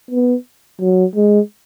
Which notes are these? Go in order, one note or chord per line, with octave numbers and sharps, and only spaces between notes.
B3
F#3
G#3